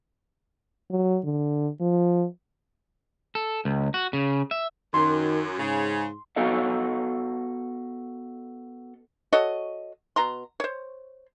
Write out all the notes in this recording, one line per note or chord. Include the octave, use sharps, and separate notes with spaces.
F#3
D3
F3
A4
C#2
F#4
C#3
E5
F#2 D#3 C6
G#2 C#3
B3 F#4 A4 D#5 F5
F#4 A4 C#5 D#5
B2 A#5 C6
C5 C#5